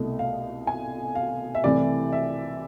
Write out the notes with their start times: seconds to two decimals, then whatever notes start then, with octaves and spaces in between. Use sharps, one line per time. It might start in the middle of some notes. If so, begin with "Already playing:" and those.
Already playing: C2 B2 A3
0.19 F5
0.67 G#5
1.15 F5
1.55 E5
1.64 C2 C3 E3 A3 C4 D5
2.13 E5